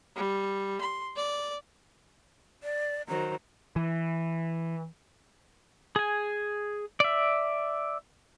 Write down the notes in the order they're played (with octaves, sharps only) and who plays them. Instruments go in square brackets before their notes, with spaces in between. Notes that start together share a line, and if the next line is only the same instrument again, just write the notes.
[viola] G3
C6
D5
[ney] D5
[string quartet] D#3 F#3 C5 [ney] A#5
[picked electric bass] E3
[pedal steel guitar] G#4 G#5
D5 E5